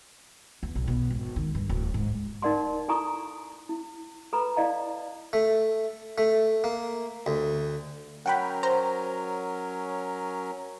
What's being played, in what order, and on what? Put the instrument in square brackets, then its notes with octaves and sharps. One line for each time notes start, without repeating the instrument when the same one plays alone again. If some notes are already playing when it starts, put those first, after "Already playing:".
[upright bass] E2
B1
B2
G#1
D#3
G2
D1
G#2
[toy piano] D#4 A#4 D5 F#5 C6
E4 A4 G#5 A#5 C#6 D#6
E4
A4 B4 A#5 B5
E4 D5 D#5 F5 A#5
[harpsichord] A3
A3
A#3
D2
[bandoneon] F#3 C#4 A#4 [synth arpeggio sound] F#5 G5 B5
[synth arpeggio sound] C5 A#5